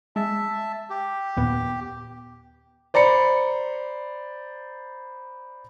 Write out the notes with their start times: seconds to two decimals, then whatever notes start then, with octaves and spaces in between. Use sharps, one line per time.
0.16 G#3 E5 A5
0.90 G4
1.37 D#2 A#2 B3
2.94 C5 D5 A#5 B5 C#7